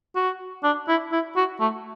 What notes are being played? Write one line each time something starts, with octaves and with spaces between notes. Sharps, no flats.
F#4
D4
E4
E4
F#4
A3